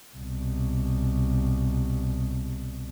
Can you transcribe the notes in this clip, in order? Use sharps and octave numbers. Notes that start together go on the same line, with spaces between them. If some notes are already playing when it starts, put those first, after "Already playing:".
C2 B2